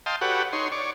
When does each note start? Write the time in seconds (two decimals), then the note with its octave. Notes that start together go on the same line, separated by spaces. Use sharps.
0.06 D#5 F5 G5 A5 C6
0.21 F#4 G4 A4 B4 C#5 F#5
0.53 D#4 C#5 C6
0.72 C#5 D5